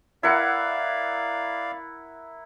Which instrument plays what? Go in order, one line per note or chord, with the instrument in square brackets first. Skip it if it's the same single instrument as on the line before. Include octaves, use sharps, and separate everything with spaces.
[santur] E4 A#4 F#5 [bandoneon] D5 F5